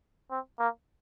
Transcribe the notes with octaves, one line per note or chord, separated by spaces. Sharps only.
C4
A#3